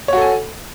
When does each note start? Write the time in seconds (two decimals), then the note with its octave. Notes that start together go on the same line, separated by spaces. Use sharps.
0.08 C#5
0.13 F#4
0.17 A4
0.22 G#5